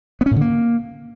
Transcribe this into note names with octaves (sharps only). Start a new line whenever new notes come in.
B3
C#4
A2
D3
A#3